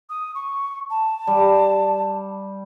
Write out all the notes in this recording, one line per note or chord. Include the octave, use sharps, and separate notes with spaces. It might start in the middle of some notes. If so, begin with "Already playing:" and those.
D#6
C#6
A5
G3